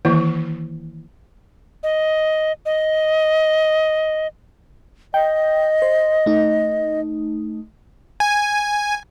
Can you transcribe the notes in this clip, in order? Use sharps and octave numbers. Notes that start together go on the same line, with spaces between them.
D#3 E3 A#3 E4
D#5
D#5
D#5 G5
C5
A3 D#4
G#5